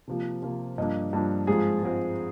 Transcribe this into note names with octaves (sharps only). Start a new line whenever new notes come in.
C3 F3 A#3 F4
C3 F3 A#3 F4
G2 F3 A#3 D4 D#5
G2 F3 A#3 D4
G#2 F3 G#3 C4 F4 G#4
G#2 F3 G#3 C4 F4